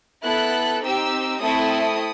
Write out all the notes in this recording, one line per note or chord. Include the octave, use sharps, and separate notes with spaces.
B3 E4 A4 F#6
C4 D#4 G4 E6
A3 C4 E4 A4 D#6